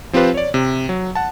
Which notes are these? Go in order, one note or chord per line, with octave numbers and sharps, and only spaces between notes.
F3 C4 F4 G4 B4 C5
C#5 D5
C3
F#3
F#5 A5